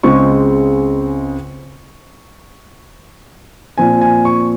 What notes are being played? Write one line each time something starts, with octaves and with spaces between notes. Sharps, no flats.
C#2 C#3 G#3 C4 C#6
A#2 F3 C4 G#5
G#5
C#6